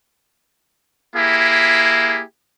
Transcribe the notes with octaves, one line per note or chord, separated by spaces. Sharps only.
A#3 E4 G4 G#4